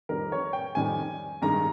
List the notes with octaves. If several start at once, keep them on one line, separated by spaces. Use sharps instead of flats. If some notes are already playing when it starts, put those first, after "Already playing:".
F2 D#3 G3 A#4
C#5
G5
F2 D#3 G3 G#5
G2 D#3 G#3 A#5